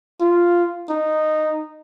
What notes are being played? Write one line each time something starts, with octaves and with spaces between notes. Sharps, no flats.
F4
D#4